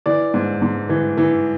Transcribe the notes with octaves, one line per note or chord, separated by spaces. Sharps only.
E3 D5
G#2
G#2
E3
E3